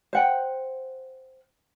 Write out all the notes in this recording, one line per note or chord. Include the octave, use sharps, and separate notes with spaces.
C5 F#5 G5